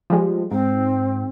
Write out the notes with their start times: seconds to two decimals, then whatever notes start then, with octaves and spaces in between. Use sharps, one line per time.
0.10 F3 G3 G#3
0.51 G#2 C4